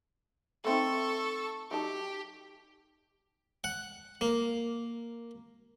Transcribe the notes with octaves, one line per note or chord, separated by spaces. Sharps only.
A3 C4 D#4 A4 C#6
F#3 D#4 G4 A5
F#5
A#3